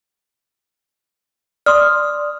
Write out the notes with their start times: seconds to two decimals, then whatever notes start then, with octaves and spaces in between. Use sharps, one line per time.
1.66 D5 C6 D#6 F6